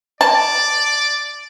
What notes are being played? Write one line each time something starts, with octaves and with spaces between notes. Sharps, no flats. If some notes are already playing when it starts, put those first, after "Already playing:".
D5 A5